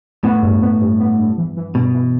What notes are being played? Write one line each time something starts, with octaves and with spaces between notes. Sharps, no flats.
A2 B3
G2
B3
G2
B3
G2
E3
E3
G2 B2
E3